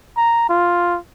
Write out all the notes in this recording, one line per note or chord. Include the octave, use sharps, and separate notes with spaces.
A#5
F4